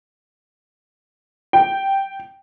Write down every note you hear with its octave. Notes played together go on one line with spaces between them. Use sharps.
G5